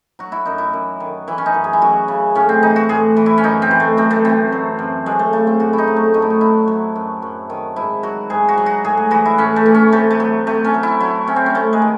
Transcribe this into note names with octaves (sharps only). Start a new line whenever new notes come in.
F#3 F#4
E4
F#2 D#4
E4
F#2
D#3
E3 E4
C#4
D#4
F#2
G#4
E4
F#2 F#4
C#3
A2 C#4
C4
E3 D#4
F#4
A2 G#4
E3
E4
C#4
F#2 D#4
C4
E3
A3
F#2 C4
A3
E3 C4
F#3
F#2
F#2 G#3
A3
C#3 A3
C4
A2 F#4
E4
D#4
F#3
A3
A2 D#4
E4
D#4
F#3 E4
F#3
F#2
F#2
D#3
G#2 E4
F#3 F#4
G#2 G#4
F#4
F#3
F#4
A2 G#4
G#4
E3 F#4
E4
A2 C#4
A3
E3
C#4
C3 A3
A3
F#3
C3 A3
C#4
F#3
E4
F#3 E4
C3 C#4
C4
C#4
C3 A3
G#3
D#3